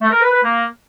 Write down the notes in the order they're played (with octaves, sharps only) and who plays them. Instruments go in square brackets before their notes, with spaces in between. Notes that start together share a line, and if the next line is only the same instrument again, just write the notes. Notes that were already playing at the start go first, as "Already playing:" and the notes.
[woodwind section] A3
A#4
B4
B4
A#3